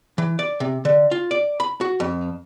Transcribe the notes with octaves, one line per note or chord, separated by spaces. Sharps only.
E3
D5
C3
D3
F4
D5
B5
F#4
F2